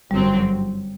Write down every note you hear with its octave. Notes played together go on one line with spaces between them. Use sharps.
G1 F#2 F#3 G3 C4